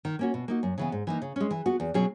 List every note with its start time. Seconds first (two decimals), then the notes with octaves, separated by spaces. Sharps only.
0.05 D#3
0.19 A#3 C#4 F#4
0.34 B2
0.48 A#3 D#4 F#4
0.63 F#2
0.78 C#3 E3 B3
0.92 G#2
1.07 E3 A#3 D#4
1.22 C#3
1.36 G#3 C#4
1.51 E3
1.66 B3 F#4
1.80 E2
1.94 B2 F#3 C#4 G#4